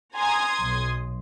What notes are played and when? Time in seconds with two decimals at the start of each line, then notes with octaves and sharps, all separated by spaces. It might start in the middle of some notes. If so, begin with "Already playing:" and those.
0.16 G#5 A#5 C6 D#6 G#6
0.61 B1